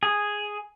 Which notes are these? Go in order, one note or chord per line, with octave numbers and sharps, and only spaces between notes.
G#4